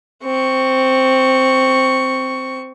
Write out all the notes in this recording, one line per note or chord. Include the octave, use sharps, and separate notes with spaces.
C4 C#6